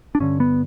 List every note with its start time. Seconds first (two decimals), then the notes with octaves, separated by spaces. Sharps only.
0.15 D4
0.20 G2 D3 C#4
0.40 B3